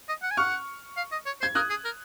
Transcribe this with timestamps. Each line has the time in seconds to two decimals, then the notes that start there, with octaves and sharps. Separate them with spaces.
0.09 D#5
0.23 F#5
0.31 G#5
0.37 F#5 C#6 F6
0.97 F5
1.12 D#5
1.26 C#5
1.41 C5 G#6
1.55 A#4 D#6 F#6
1.70 G#4
1.85 A#4